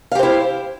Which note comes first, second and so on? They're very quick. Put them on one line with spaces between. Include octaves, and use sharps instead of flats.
F5 G4 C5 E4